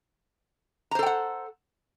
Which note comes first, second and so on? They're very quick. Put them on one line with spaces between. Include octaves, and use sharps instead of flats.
A#5 C5 A4 G5 F#5